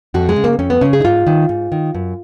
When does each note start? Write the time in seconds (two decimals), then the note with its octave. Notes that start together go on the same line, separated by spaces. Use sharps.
0.14 F2 F#4
0.29 G#3
0.36 C#3
0.44 A#3
0.59 F2 C#4
0.70 B3
0.81 C#3 C#4
0.93 G#4
1.00 D#4
1.05 G#2 F4
1.27 D#3
1.49 G#2
1.72 D#3
1.95 F#2